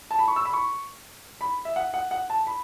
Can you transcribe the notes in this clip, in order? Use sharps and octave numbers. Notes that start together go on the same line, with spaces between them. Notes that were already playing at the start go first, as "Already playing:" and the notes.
A5
B5
C#6
E6
B5
C#6
B5
E5
F#5
F#5
F#5
A5
B5